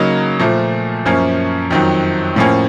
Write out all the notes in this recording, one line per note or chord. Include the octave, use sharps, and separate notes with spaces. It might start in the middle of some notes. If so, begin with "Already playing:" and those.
Already playing: C#3 F#3 A#3 D#4
A#2 F3 A3
F#2 F3 A#3 C#4
F2 D#3 F#3
A2 F3 A#3 C#4